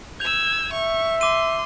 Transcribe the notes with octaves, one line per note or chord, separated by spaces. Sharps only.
E6 G6 G#6 F7
E5 C#6
C6 D6 D#7